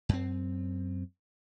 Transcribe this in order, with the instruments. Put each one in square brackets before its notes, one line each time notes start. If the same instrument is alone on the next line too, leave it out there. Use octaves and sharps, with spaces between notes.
[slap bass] F#2 C4